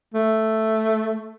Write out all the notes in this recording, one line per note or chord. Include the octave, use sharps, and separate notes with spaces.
A3